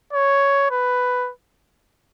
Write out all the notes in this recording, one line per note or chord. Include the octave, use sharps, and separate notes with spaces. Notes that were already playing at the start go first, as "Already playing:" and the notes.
C#5
B4